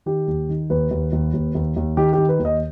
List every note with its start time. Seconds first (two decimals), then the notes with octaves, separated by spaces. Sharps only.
0.06 D#3 G4
0.28 D#2
0.49 D#3
0.70 D#2 B4
0.91 D#2
1.13 D#2
1.34 D#2
1.55 D#2
1.76 D#2
1.97 D#3 G4
2.13 G4
2.18 D#3
2.29 B4
2.39 D#2
2.45 D#5